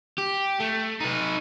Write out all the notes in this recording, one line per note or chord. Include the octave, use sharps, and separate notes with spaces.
G4
A3
D#4 B4